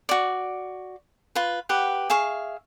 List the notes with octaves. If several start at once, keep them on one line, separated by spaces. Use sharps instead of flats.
F#4 D5
F4 B4
G4 B4 F#5
G#4 E5 F5 C#6